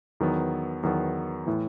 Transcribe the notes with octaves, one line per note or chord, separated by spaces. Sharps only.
E2 D#3 F#3 B3
E2 D#3 F#3 B3
A2 E3